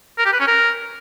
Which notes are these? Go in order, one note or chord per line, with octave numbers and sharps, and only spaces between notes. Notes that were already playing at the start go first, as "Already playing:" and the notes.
A#4
G4
B4
C#4
A#4